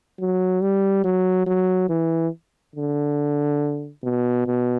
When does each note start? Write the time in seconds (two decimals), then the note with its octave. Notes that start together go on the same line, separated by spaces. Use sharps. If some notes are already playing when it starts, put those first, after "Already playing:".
0.19 F#3
0.61 G3
1.04 F#3
1.47 F#3
1.89 E3
2.76 D3
4.03 B2
4.47 B2